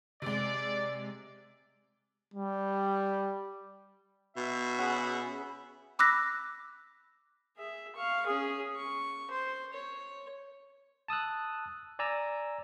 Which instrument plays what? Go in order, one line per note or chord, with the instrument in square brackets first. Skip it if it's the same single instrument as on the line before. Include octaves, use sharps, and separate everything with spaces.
[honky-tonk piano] C3 G#3 [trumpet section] D5
[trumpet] G3
[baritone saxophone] B2 [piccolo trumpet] E5
[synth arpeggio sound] C#4 G#4 B5 [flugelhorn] F#5
[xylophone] B5 D6 E6 F#6 A#6 B6
[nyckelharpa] G#4 E5
F5 C#6
C#4 G#4
C#6
C5
C#5
[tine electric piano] A5 D#6 E6 F#6
D5 G#5 A#5 E6